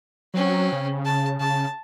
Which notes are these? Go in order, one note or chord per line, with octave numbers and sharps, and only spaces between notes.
F#3 C4 C#4
C#3
A5
C#3 A5